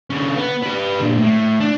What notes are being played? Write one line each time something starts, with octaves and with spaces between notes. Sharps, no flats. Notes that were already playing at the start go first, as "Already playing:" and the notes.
D3 C#4
B3
G4 B4
A#2 D3
A2
D4